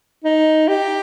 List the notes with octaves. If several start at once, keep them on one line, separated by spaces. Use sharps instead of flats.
D#4
G4